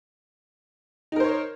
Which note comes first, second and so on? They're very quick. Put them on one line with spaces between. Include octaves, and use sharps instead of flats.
D#4 A#4 C5 C#5